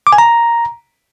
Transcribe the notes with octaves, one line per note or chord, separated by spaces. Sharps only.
D6
G#5
A#5